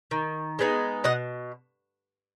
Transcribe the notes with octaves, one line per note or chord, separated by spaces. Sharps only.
D#3
G#3 B3 D#4
B2 D#5 F#5